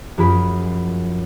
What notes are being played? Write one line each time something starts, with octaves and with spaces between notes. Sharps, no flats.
F#2 F3 F4 G#4 B5 D7